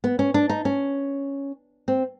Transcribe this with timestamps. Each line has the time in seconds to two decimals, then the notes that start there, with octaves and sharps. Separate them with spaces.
0.04 B3
0.19 C#4
0.34 D4
0.50 D#4
0.65 C#4
1.88 C4